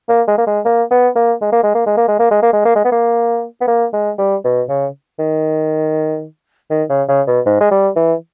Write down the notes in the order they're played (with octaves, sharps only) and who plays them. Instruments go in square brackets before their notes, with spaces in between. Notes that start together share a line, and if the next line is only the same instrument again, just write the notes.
[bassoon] A#3
G#3
A#3
G#3
A#3
B3
A#3
G#3
A#3
G#3
A#3
G#3
A#3
G#3
A#3
G#3
A#3
G#3
A#3
G#3
B3
A#3
B3
A#3
G#3
G3
B2
C#3
D#3
D#3
C#3
C#3
B2
G#2
G#3
G3
E3